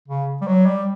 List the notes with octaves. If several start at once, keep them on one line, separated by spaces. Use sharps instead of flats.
C#3
G3
F#3
G3